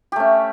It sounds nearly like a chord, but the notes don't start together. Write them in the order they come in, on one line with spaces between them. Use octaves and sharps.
G4 A3 C#4